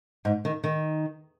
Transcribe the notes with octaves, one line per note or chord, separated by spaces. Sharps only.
G#2
D#3
D#3